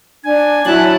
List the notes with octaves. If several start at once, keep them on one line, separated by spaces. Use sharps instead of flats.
D4 G#5
F#3 E4 G#5 A5 F#6